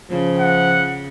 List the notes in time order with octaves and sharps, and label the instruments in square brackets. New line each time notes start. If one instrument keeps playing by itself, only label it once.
[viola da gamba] C#3 [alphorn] F3
[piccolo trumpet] F#5